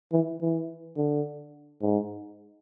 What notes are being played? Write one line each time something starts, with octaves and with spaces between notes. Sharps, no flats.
E3
E3
D3
G#2